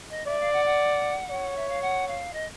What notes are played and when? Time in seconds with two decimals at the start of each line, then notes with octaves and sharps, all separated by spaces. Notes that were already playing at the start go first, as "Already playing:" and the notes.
0.10 D#5
0.27 D5 E5
0.40 F5
0.52 F#5
0.65 F#5
1.30 C#5
1.56 E5
1.68 F5
1.81 F#5
2.08 F5
2.33 D#5